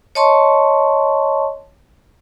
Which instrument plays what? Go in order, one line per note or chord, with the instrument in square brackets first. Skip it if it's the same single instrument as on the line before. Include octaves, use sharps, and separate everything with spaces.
[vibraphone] C#5 D#5 A5 C6 C#6